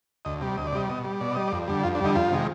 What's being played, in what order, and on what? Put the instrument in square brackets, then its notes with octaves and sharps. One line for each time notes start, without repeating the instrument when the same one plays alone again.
[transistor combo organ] D2 D#5
C3 G3
D2 D#5
D5
C3 G3 D#5
B2 D#5
G3
B2 D5
G3 D#5
F2 D5
D3 G3
F2 F4
D4
D3 G3 D#4
F2 F4
C3 D#3 G#3